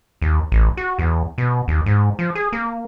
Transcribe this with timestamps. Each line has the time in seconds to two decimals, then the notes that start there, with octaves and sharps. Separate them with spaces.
0.22 D#2
0.52 A1
0.77 F#4
0.99 E2
1.38 B2
1.68 D#2
1.86 G#2
2.19 F3
2.35 G#4
2.53 A#3